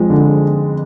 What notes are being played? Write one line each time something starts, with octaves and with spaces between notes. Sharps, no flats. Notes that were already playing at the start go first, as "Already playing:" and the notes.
Already playing: F2 F3 G#3
D3